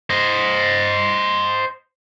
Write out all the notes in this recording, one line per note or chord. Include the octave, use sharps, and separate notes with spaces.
C5 D#5